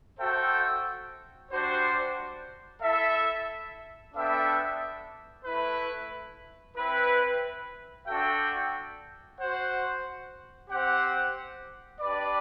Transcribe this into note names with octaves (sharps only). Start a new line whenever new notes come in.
F#4 A4 C5 E5 G5
G3 D4 F#4 C5
E4 A4 E5
B3 D4 A4 E5 G5
A3 E4 B4
C4 E4 B4
D4 F#4 A4 E5 G5
F#4 C5 F#5
C4 G4 C5 F#5
D4 G4 B4 D5